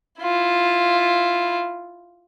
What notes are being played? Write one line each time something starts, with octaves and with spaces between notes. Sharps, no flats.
E4 F4